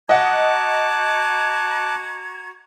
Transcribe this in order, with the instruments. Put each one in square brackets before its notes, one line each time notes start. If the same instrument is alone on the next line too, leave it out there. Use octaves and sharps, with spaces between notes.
[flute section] F#4 A#5 G#6 [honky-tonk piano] D#5 F#5 [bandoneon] A5 D6 F#6